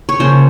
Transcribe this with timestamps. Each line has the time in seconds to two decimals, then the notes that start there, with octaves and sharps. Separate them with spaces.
0.09 C#5
0.19 C#3 F3 A#3 C5